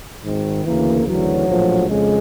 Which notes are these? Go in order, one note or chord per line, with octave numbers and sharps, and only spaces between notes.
G#1 G#2 D#3
D2 C#3 E3 A#3
D2 C#3 E3 F#3
A#1 A2 F3
F2 C#3 G#3